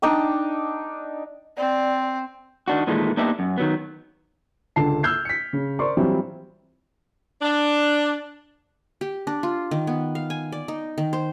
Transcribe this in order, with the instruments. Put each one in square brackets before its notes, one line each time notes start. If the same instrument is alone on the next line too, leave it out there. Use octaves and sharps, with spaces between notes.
[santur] D4 D#4 D5 G5
[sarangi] C4 [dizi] D5
[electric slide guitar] D#3 D4 F#4
A#2 D#3 E3 G#3 A3
A#3 B3 D4 D#4 G4 E5
F#2
D#3 F#3 B3
[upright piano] C#2 D3 A5 C7
E6 F6 G6 G#6 C7
B6 C#7
C#3
A#4 C5 D5 C6 C#6
E3 F#3 G3 C4 E4 F4
[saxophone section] D4
[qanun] G4
D4
F4
D#3
B3
F5
G#5
D5
D#4
D#3
C5